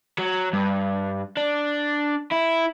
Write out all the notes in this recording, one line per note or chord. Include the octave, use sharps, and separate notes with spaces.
F#3
G2
D4
E4